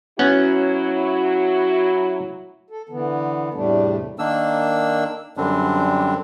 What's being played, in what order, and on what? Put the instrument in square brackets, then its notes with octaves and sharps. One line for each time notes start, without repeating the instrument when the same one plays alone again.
[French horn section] F#3 E4 [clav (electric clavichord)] B3 C#4 F#5 [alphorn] F#4
[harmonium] A4
D3 E3 B3
E2 A2 C3 G3 A3 D4
[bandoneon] D#3 A#3 D4 E6
F#2 D3 G3 C4 D4